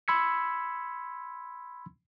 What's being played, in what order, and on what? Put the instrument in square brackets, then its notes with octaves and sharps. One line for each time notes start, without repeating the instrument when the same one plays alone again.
[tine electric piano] B5 C6 E6 G#6 B6 C#7